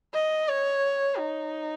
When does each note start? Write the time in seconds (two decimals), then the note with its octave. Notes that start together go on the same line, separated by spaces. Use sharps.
0.14 D#5
0.49 C#5
1.18 D#4